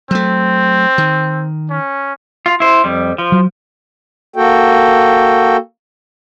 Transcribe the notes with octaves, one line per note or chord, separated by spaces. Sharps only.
F#3 A3 C4
D#3
C#4
F4
E4 C5
F2 G3
F3
F#3
A#3 F#4 A4 G5